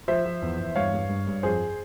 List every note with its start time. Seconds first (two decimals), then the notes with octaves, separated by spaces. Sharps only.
0.08 F3 C5 E5
0.25 F3
0.42 E2
0.60 E2
0.75 G2 C#5 F5
0.93 G2
1.09 G2
1.27 G2
1.43 F2 G#4 C5